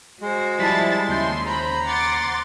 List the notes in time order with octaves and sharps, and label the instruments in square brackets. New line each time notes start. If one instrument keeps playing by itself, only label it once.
[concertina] G#3 [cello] F#4 C5
[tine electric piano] F3 G3 B6 [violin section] E4 A5 A6
[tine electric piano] D#2 G6 [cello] C#3 [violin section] E4 E5 C6
[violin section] C5 B5 [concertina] A#5
[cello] F#5 [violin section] C6 D6 A6